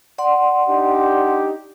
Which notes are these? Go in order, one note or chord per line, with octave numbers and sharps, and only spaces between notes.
D5 F#5 C6
D4 D#4 G4